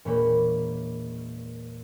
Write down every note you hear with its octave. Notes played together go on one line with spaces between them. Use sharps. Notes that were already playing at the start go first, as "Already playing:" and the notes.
E1 A#2 A#3 C#5 B5